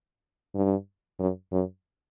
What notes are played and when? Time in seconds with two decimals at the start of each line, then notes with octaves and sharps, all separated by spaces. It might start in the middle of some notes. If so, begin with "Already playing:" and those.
0.55 G2
1.20 F#2
1.52 F#2